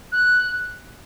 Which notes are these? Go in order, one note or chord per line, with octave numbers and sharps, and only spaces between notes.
F#6